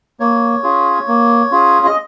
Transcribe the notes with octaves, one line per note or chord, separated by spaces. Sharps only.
A#3 C#5
C#4 F4 G#4
A#3
C#4 F4 G#4
D#5